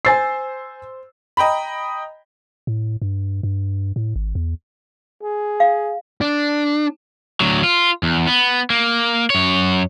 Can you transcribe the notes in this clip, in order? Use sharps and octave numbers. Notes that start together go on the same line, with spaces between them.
C5 G#5 E6 A6 C7
D#5 G5 A#5 B5
A2
G2
G2
A2
G#1
E2
G#4
F5
D4
D2 F#3
F4
E2
B3
A#3
F#2 C#5